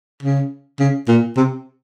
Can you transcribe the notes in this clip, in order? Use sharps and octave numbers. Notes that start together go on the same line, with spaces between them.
C#3
C#3
A#2
C3